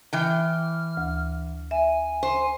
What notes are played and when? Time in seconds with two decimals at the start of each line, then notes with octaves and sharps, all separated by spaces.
0.13 E3 G5 F6
0.97 D2
1.71 E5 G#5
2.23 C5